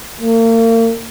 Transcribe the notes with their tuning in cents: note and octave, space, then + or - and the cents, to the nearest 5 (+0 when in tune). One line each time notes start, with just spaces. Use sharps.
A#3 -40